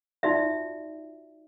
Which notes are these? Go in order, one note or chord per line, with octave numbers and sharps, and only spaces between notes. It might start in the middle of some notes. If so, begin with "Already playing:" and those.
D#4 F4 F#4 D5 E5